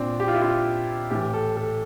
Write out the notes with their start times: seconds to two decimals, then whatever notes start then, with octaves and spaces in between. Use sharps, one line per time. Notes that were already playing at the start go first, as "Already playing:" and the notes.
Already playing: A#2 C4 D4
0.20 G4
0.28 F4
0.34 E4
0.42 F4
1.11 A2 E3 G4
1.34 A4
1.57 A4